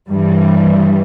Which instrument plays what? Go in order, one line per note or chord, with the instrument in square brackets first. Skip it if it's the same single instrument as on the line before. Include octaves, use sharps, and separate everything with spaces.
[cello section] G2 E3 G3